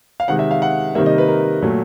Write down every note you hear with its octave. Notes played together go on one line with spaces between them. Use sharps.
F5
C3 D#3 G#3 F#5
E5
F5
F#5
C3 D#3 G3 A#3 E5
D#5
B4
A#4
A#2 F#3 A3